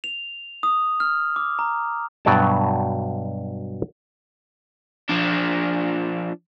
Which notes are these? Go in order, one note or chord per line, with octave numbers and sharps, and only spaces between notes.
F7
D#6
F6
D6
A#5
G2 B2 F#3 D5 G5 A5
F3 D4